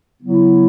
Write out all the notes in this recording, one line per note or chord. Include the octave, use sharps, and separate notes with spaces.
C#3 F#3 B3 E4